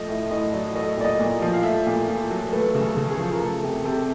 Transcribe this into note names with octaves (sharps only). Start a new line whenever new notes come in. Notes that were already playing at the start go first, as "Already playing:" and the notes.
Already playing: F3 A3 D#5
A2 E5
A2 D#5
F#3 D5
A3 D#5
A#2 D5
D#5
A#2
F3
F5
A3 E5
A#2
A#2
F#3
A3 B4
C#3
A4
C#3
G#4
F3
A#4
A3 A4
C3 G#4
C3 A4